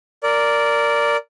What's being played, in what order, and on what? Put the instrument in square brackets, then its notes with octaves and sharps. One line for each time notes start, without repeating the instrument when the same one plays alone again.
[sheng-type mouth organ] A#4 D5